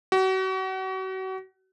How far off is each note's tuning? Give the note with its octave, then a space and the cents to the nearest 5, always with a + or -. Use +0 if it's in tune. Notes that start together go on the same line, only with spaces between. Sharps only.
F#4 +35